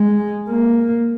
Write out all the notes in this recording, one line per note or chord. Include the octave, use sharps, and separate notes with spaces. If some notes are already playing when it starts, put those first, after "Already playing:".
Already playing: G#3
A#3